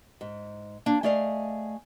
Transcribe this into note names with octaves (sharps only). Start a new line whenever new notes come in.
G#2
A#3 D4
A3 G#4 D5 D#5 F5